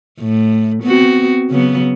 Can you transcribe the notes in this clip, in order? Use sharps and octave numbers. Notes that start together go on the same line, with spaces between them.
A2
B3 C4 F#4
C#3 F#3 B3